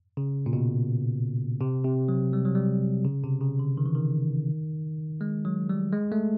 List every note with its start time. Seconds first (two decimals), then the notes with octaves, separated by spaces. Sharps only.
0.17 C#3
0.46 A#2
0.53 B2
1.61 C3
1.85 C3
2.09 F#3
2.33 G3
2.45 F#3
2.55 G3
3.05 C#3
3.23 C3
3.41 C#3
3.59 D3
3.77 D#3
3.86 E3
3.95 D#3
5.21 G#3
5.45 F#3
5.69 G3
5.93 G#3
6.12 A3